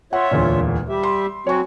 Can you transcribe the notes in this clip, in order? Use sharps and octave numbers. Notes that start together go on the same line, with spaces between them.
F4 C#5 E5 F#5
E1 D2 A#2
G3 G4 E5
C6
F#3 C4 F#4 C#5 G#5 C#6